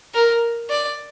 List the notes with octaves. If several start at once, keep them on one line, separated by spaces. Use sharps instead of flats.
A#4
D5